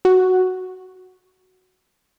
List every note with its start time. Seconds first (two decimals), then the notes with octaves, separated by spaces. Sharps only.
0.05 F#4